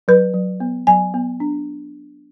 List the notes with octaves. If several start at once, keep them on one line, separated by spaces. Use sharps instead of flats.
F#3 B4
F#3
B3
F#3 G#5
B3
D4